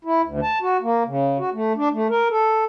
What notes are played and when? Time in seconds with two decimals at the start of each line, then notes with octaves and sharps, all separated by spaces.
0.05 E4
0.24 D2
0.43 A5
0.62 F#4
0.82 A#3
1.07 C#3
1.39 F#4
1.53 A3
1.77 D4
1.92 A3
2.09 A#4
2.30 A4